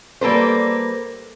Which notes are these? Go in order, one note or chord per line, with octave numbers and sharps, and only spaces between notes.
G3 A#3 A4 B4 C5